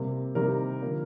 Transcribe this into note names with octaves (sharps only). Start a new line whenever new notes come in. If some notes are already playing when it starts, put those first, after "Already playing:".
Already playing: C3 G3 A#3
C3 D#3 G3 A#3 A#4
D3 F3 A#3